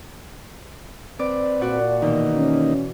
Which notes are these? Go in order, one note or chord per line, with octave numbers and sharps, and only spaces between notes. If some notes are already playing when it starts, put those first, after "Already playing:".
C4 B4 D5 D6
A#2 F#4 D5 F#5
B2 D#3 E3 A#3 D#4
C#4